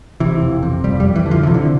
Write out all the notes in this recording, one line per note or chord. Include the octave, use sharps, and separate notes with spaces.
C3 E3
F2
C3
F2 G3
G3
F2
E3
D3
F3
C3 E3
D3